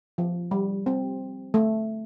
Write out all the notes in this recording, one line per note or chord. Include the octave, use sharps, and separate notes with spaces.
F3
G3
C4
A3